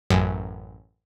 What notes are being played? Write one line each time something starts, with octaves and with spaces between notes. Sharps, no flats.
A1 F#2